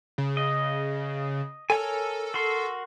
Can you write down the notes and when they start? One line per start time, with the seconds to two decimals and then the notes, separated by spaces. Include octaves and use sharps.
0.18 C#3
0.37 D#5
1.70 A4 A#4 C#5 G#5
2.34 F#4 A#4 C6